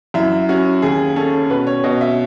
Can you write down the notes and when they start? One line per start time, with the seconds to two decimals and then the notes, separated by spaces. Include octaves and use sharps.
0.14 F#2 E4
0.49 C#4 F#4
0.82 D#2 G#4
1.16 C#4 A4
1.50 B2 B4
1.67 C#5
1.84 B2 D#5
2.01 E5